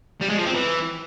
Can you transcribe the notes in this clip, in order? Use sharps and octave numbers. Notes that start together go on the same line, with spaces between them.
G3
G#3
F3
C4
E3